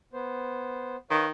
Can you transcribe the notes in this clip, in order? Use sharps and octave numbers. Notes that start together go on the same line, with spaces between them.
B3 C5
D#3 B4 C#5 F5